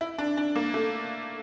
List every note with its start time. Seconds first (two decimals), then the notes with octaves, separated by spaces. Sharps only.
0.01 E4
0.18 D4
0.37 D4
0.56 A#3
0.74 A3